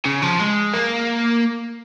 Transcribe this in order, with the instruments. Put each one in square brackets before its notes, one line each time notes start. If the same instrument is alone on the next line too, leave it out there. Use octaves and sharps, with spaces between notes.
[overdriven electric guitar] C#3
F3
G#3
A#3